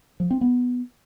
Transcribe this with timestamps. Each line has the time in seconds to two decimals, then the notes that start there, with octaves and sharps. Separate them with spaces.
0.20 F3
0.31 C4
0.41 B3